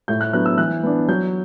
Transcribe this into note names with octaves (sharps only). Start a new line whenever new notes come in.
A2 G6
F#6
F#3 B3 D4 F#6
E6
E3 F#6
B3 D4
F#3 G6